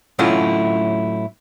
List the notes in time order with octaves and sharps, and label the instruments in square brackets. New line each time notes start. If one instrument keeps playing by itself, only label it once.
[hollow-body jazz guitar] A2 F#3 A3 C#4 E4 F4